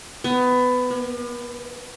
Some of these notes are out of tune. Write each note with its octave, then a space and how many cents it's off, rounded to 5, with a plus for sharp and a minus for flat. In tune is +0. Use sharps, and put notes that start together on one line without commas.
B3 +20
B3 -45